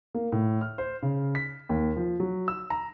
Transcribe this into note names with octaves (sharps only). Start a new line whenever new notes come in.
A#3
A2
F6
C5
C#3
B6
D#2
F3
F#3
E6
A#5